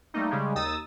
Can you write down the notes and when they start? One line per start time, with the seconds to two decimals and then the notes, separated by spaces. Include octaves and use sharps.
0.14 G3 A3 A#3 D#4
0.31 C#3 G3 G#3
0.55 D#2 D#4 D#6 E6 A6